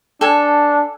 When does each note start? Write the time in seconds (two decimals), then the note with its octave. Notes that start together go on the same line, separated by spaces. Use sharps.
0.21 D4 A4 G#5